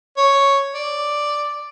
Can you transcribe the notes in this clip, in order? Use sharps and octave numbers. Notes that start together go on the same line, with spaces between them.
C#5
D5